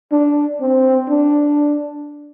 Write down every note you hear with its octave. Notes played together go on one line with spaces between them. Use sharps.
D4
C4
D4